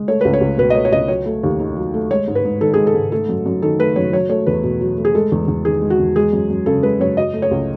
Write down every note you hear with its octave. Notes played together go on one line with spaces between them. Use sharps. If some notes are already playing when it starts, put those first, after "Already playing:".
Already playing: G#3
A3 C#5
C#2 B4
C#5
C#2
B2 B4
D#5
A3 C#5
C#5
C#2 D#5
F#3 C#5
A3
D#2
D#3
F#3
A3
G#3 C#5
G#2
B4
G#2
D#3 A4
G#3 G#4
A4
G#2
A3 A4
F#2
F#2
D#3 A4
A3 B4
F#2 C#5
F#3 C#5
A3 C#5
E2 B4
B2
F#3
A3
G#4
G#3 A4
E2
E2
D#3 G#4
G#3
F#4
E2
G#3 G#4
F#2
F#2
C#3 A4
G#3 B4
F#2 C#5
F#3 D#5
A3
C#5
C#2